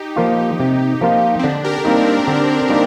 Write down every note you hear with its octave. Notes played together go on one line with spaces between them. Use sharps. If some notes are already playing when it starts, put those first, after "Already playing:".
Already playing: D#4 G4
F3 A#3 F4
C3
F3 A#3 F4
C4
D3 D4
G4 A#4
G3 A#3 C4 D#4
D4
D3 C4
G3 A#3 D#4